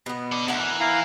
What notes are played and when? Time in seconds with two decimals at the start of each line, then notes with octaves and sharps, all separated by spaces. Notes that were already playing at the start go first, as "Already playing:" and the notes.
0.06 B2 B3
0.32 A4 D5
0.48 D2 A#4 F#5
0.60 E3
0.80 E4 F5 A#5